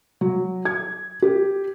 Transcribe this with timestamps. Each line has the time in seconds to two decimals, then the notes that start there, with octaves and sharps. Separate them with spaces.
0.21 F#3
0.65 G#6
1.22 G4